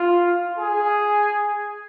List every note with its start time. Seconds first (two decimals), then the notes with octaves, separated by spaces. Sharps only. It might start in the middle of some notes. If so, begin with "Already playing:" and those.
Already playing: F4
0.58 G#4